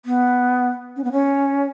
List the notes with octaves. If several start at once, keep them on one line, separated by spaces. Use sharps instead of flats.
B3
C#4
B3
C#4